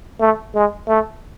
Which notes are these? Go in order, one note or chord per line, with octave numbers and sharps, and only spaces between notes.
A3
G#3
A3